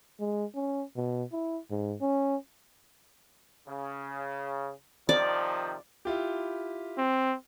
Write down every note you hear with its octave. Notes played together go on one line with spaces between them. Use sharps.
G#3
C#4
B2
E4
G#2
C#4
C#3
C3 D#3 F3 D5
E4 F4 G4
C4